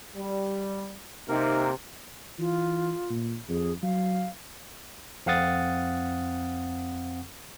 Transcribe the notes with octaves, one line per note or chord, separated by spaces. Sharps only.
G3
C3 A#3 D#4 A#4
E3 F4
A#2
F2 G#4
F#3 F5
F2 C4 F5 F#5 D#6 A6